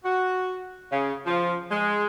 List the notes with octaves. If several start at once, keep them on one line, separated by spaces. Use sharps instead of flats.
F#4
C#3
F3
G#3